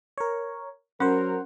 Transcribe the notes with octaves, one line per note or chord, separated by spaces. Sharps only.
A#4 C#5
F#3 C#4 A#4 C5 F#5